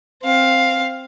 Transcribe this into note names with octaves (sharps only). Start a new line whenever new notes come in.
C4 F5